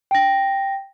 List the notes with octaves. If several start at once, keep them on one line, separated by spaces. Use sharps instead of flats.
G5 A#6